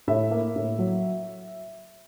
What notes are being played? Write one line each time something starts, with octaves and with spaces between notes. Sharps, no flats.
A2 E5
A#3
A2
F#3